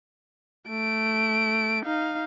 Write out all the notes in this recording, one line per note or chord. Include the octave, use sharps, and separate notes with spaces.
A3 D7
D#4 F5